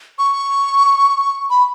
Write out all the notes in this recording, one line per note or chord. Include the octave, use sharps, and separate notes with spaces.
C#6
B5